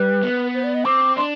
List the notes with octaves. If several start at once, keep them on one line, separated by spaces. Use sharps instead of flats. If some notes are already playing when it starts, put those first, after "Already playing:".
Already playing: G3 B4
B3
C5
D5
D#5
C4 D6
D4 C6